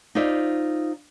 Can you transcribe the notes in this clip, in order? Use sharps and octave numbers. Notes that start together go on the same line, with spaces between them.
D#4 F4 C5 D5 E5